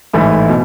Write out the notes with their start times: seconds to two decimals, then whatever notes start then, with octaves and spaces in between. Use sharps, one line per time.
0.13 A1 G#2 E3 A3 E4
0.49 B2